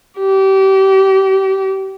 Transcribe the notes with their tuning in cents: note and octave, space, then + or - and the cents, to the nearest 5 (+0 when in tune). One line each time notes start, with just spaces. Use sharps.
G4 -30